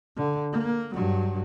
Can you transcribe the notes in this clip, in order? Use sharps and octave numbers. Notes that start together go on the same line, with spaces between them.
D3
A#3
G2 F#3